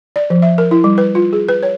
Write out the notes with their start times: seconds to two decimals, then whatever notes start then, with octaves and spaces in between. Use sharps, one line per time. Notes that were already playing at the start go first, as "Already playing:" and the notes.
0.16 D5
0.30 F3
0.42 E5
0.58 A#4
0.71 E4
0.84 G3
0.98 B4
1.15 F4
1.33 G#4
1.49 B4
1.63 C#5